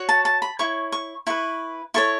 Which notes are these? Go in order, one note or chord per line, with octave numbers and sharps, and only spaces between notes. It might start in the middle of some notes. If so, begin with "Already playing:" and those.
Already playing: F#4 C#5
A5
A5
B5
E4 C#5 C#6
C#6
E4 B4 C#6
E4 A4 C#5 C#6